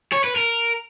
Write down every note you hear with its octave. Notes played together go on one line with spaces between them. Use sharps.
C#5
B4
A#4